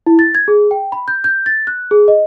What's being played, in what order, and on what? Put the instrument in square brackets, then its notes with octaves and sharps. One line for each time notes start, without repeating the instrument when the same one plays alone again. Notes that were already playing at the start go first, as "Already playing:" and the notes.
[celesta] E4
A6
G#6
G#4
G5
B5
G6
G6
A6
F#6
G#4
D#5